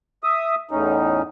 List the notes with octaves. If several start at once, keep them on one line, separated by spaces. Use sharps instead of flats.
E5 D#6
E2 A2 C#4 D#4